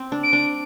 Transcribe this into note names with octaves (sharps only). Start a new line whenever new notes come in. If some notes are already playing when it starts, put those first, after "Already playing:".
Already playing: C4
D4
D7
D4